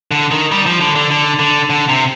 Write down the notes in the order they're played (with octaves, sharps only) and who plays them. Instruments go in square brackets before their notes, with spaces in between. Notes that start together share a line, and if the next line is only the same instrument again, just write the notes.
[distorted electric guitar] D3
D#3
G3
F3
D3
D3
D3
D3
D3
C3